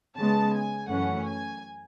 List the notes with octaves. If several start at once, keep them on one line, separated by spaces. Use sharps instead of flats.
C#3 G#3 B3 A5
G#5
F#2 E3 A3 C#4 F#5
G#5